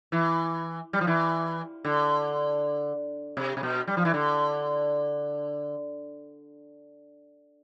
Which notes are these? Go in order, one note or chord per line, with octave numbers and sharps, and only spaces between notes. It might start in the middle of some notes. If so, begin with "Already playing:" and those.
E3
G3
F3
E3
D3
C3
C3
B2
G3
F3
E3
D3